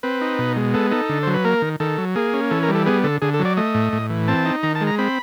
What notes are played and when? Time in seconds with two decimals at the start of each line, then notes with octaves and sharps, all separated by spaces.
0.03 C4 B4
0.21 D#4
0.39 B2
0.56 G#3
0.74 B3 A4
0.91 D#4 A4
1.09 D3
1.23 F#3 C5
1.34 B4
1.44 A#3 A#4
1.62 D#3
1.80 D#3 A4
1.98 F#3
2.16 A#3 G#4
2.34 C#4
2.51 E3 A4
2.63 A#4
2.69 G3
2.75 A4
2.86 B3 G#4
3.04 D3 A4
3.22 D3 G#4
3.34 A4
3.40 F#3
3.45 D5
3.57 A3 D#5
3.75 A2
3.93 A2
4.10 E3
4.28 C4 A5
4.45 D#4
4.63 D#3 A#5
4.75 A5
4.81 G#3
4.87 A#5
4.99 C4 B5